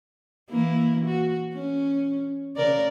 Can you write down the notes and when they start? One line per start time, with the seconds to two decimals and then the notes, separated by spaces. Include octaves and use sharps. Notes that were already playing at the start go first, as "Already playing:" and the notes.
0.50 E3 A#3 E4
1.05 F#4
1.53 C#4
2.56 C#3 A#4 D5